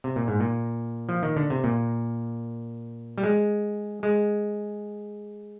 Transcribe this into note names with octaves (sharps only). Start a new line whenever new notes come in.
C3
A#2
G#2
A#2
F3
D#3
D3
C3
A#2
G3
G#3
G#3